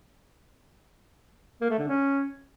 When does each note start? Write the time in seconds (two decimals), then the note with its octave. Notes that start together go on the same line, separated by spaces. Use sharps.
1.61 A#3
1.70 A3
1.79 D3
1.88 C#4